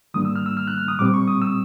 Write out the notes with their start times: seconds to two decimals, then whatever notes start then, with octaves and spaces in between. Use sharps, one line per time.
0.14 G#2 D#3 G3 A#3 D4 D#6
0.25 E6
0.36 F6
0.46 E6
0.57 F6
0.67 F#6
0.78 F6
0.88 D#6
0.99 A#2 G3 C4 D6
1.14 C#6
1.28 D#6
1.42 E6